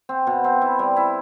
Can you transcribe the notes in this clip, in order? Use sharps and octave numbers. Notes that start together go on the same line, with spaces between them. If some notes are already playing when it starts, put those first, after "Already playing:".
C4
B2
C4
E4
G3
E4